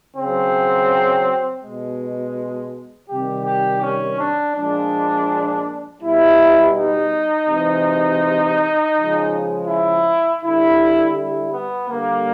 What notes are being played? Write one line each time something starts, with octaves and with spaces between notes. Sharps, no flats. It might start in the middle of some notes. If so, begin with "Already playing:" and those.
C#3 F#3 C4
B2 G#3
C3 D#3 G3 G4
G4
C#4
D4
A#2 F3 G#3 D4
B2 G3 E4
D#4
C3 E3 G#3
C#3 F3 G#3
E4
D3 G3 E4
E4
B3
D3 G3 A#3